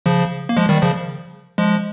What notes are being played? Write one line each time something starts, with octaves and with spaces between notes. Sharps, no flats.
C#3 F3
A#3
F3 G#3
D#3 G3
C#3 F3
F3 G#3